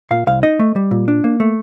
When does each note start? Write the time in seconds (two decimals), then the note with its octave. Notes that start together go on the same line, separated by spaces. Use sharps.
0.11 A#2 F5
0.27 C2 F5
0.43 D#4 D#5
0.59 A3
0.76 G3
0.91 A#2
1.08 D4
1.24 A#3
1.40 A3